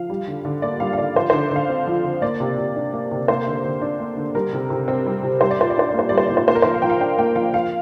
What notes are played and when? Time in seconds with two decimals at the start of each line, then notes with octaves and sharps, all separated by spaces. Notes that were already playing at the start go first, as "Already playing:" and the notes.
Already playing: F3 F5
0.10 G3
0.27 D3
0.45 D3
0.62 A#3 D5
0.80 G3 F5
0.93 F5
0.98 D3 D5
1.15 F3 C5
1.30 D3 C5
1.51 D3 F5
1.69 C4
1.87 F3
2.04 D3
2.22 A#3 D5
2.40 C3
2.58 C3
2.76 D4
2.93 A#3
3.11 C3
3.28 A#3 C5
3.47 D3
3.64 D3
3.82 D4
4.00 A#3
4.17 D3
4.35 G3 A#4
4.53 C3
4.70 C3
4.88 C4
5.06 G3
5.23 C3
5.41 G3 C5
5.51 D5
5.59 A#2 C5
5.70 D5
5.77 D4 C5
5.89 D5
5.94 A#3 C5
6.09 G3 D5
6.18 C5
6.27 A#2 D5
6.37 C5
6.48 A#3 C5
6.55 A#4
6.62 F3 C5
6.74 F5
6.82 F3 G5
6.90 F5
7.00 D4 G5
7.18 A#3 G5
7.36 F3 F5
7.54 F3 F5